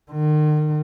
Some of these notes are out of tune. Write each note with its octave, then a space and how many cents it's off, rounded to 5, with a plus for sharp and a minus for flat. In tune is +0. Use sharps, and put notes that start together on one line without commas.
D#3 -40